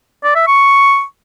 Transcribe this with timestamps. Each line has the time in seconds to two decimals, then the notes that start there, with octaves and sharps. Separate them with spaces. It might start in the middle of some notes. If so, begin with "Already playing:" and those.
0.23 D5
0.35 E5
0.47 C#6